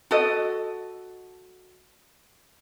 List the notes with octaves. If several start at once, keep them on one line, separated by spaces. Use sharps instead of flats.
F#4 A4 D#5